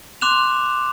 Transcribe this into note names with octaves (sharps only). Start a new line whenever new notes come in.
C6 D6 F#6 E7 F7